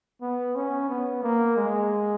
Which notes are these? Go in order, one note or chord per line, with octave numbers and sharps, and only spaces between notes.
B3
C#4
B3
A#3
G#3